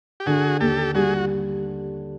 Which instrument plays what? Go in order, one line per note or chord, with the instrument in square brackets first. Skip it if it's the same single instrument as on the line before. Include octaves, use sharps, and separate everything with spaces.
[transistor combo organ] G4
[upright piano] D3 [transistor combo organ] F#4 G#4
[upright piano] D#2 [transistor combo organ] G4 A4
[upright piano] G3 [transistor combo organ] F#4 G#4